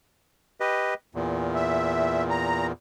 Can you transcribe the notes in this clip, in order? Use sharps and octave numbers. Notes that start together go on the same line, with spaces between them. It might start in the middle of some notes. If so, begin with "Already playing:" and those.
G4 B4 D#5
E2 A#2
E5
A#5